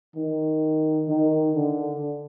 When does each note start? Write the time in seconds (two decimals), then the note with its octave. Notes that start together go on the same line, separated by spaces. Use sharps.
0.16 D#3
1.08 D#3
1.55 D3